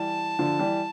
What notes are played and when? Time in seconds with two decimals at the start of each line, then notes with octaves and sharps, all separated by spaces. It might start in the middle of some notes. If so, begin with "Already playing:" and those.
Already playing: E3 G3 A5
0.39 D3 F3
0.59 E3 G3